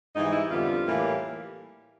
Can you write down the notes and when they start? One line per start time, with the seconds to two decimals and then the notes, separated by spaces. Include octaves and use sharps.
0.15 G#2 E3 G3 D#4
0.33 E4
0.49 F2 D3 G3 B3 F4
0.85 A2 E3 G3 A#3